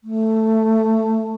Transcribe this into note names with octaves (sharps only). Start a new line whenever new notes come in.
A3